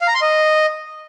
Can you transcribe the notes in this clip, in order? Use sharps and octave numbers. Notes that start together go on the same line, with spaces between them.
F5
A#5
C6
D#5